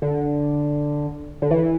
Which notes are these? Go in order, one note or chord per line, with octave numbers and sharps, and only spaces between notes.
D3
D3
E3